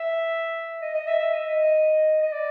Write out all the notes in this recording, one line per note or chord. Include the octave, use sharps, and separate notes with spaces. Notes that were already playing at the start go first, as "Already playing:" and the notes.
Already playing: E5
D#5
D#5
E5
E5
D#5
D#5
D5